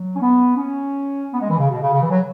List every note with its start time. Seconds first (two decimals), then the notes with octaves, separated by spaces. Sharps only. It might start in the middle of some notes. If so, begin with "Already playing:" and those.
Already playing: F#3
0.15 C#4
0.22 B3
0.56 C#4
1.33 B3
1.41 G#3
1.50 E3
1.59 C#3
1.71 B2
1.82 C#3
1.93 C#3
2.02 E3
2.10 F#3